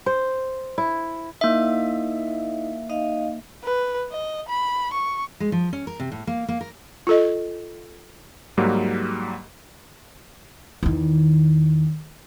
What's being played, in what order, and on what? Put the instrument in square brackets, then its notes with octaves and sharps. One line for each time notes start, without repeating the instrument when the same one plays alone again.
[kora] C5
E4
[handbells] A#3 E5 [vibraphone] D#4 E4 D#5
[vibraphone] D#4 D#5 F5
[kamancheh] B4
D#5
B5
C#6
[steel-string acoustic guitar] G#3
F3
C#4
A#4
C3
A2
A#3
A#3
A#4
[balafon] F4 A4 D#5
[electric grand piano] G#2 F#3 G3 A#3
[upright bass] E2 D#3